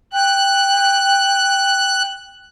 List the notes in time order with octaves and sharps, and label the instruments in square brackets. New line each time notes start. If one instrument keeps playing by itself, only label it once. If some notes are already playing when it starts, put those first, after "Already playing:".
[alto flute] G5 [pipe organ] F#6